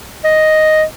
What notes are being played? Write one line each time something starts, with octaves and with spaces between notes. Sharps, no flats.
D#5